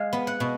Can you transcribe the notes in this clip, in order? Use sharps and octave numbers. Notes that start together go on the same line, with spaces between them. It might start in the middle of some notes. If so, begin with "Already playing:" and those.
Already playing: G#3 F5
B3
F#5
B2